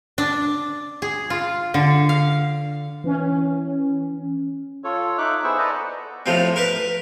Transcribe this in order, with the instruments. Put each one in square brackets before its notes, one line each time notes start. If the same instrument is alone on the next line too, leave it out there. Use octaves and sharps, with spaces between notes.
[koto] D4
G#4
F4
D3
F5
[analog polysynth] E3 C#4
[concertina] F4 A4 C#5
D#4 E5 D6 F#6
B3 E4 G#4 C5 C#6 E6
A4 B4 D5 D#5 F#5 A#5
[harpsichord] A2 F3 C4
A#4 B4